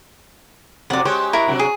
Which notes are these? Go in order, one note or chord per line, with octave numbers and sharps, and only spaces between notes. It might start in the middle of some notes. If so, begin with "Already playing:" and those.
F2 C3 F#3 D5 F#5
G#3 G4 C5 C#5
E4 A#4 C#6
C3 F#3 D4
G#4